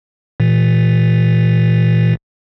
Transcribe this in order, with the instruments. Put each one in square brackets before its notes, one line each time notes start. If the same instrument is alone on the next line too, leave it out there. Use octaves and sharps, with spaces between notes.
[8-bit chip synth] A#2 E3